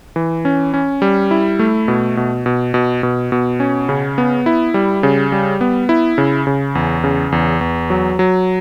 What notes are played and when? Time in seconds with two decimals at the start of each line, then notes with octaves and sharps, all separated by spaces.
0.16 E3
0.45 C#4
0.74 C#4
1.02 G3
1.31 E4
1.59 A3
1.88 B2
2.17 B2
2.46 B2
2.74 B2
3.03 B2
3.32 B2
3.60 C#4
3.89 C#3
4.18 B3
4.46 E4
4.74 G3
5.03 C#3
5.32 G3
5.61 B3
5.89 E4
6.18 C#3
6.47 C#3
6.75 E2
7.04 C#3
7.32 E2
7.61 E2
7.90 F#3
8.19 F#3